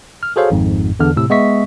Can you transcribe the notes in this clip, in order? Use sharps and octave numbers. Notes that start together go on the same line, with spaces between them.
F6
F#4 G#4 A4 C5 C#5 F5
G#1 F2 G#2
E2 D3 F6
A2 C3 E6
G#3 B3 D#5 E5 C#6 B6